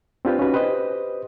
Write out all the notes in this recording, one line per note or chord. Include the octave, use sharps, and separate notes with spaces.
C4 D4 F4 G4 B4
C#4 D#4 F#4 B4
G4 B4 C5 D#5